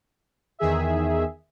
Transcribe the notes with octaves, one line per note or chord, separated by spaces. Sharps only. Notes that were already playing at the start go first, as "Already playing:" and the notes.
E2 D#3 G#4 E5